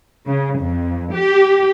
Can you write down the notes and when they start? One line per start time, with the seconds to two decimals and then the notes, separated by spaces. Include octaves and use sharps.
0.28 C#3
0.59 F2
1.14 G4